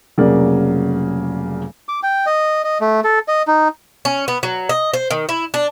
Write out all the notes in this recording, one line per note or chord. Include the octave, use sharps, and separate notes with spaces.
F1 C#3 F#3 A#3 D5
D6
G5
D#5
D#5
A3
A4
D#5
D#4
C#4
B3
F#3
D#5
C5
D#3
E4
D4